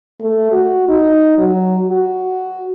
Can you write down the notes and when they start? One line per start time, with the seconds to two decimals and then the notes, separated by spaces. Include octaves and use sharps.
0.20 A3
0.52 F#4
0.88 D#4
1.38 F#3
1.89 F#4